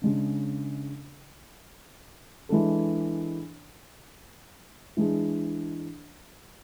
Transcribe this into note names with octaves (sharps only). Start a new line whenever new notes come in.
C#3 G#3 D4
E3 G#3 D4 A4
E3 G#3 D4 G#4